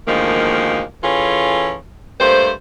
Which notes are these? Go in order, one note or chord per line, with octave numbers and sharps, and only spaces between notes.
D2 D#3 F3 G#3 A#3
E3 C#4 F4 G#4 A4
G2 A3 A#3 C5